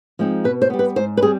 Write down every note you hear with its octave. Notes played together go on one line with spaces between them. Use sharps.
F3 G#3 C4 D#4
B2 B4
C5
G3 B3
B4
G#2 C5
B4
G3 C4 G#4